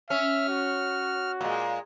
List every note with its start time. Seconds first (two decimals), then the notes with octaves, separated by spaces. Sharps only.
0.10 C#4 E5 F6
0.49 F#4
1.41 A#2 G#3